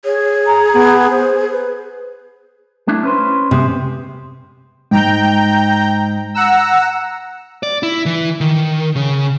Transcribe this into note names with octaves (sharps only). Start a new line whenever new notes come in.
G#4 C#5
A#5
B3
C5
B4
A3 D4 E4
C#4 B4 C5
C3 G#3 B3
G#2 G5 A#5 G6
F#5 A#5 E6
D5
E4
E3
D#3
C#3